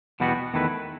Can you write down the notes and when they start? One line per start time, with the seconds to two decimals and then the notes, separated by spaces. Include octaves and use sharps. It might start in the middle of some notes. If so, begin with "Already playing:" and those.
0.20 E2 B2 G3 B3 F#4
0.54 E2 D#3 A3 E4 B4